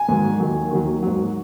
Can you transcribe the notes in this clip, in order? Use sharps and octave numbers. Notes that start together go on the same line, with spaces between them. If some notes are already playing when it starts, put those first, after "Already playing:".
Already playing: G#5
G#2 D#3 F#3
D#2 D#3 F#3
D#2 D#3 F#3
G#2 F#3